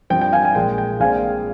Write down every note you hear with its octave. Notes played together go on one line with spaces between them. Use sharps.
G2 F3 C4 G5
G5
F5 G#5
G#5
A#1 A#2 G#3 G5
G5
A#1 A#2 G#3 C4 F5 G#5